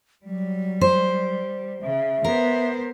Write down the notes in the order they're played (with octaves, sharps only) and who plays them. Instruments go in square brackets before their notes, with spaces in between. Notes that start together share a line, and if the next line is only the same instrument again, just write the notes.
[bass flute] F#3 [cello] G3
[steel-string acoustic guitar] C5
[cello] C#3 [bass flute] E5
[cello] B3 C5 [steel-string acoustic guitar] A#4